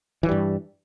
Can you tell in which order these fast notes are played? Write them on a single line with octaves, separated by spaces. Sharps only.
E3 F3 G3 G2